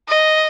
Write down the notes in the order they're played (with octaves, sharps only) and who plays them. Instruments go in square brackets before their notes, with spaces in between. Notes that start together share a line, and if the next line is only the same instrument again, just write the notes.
[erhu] D#5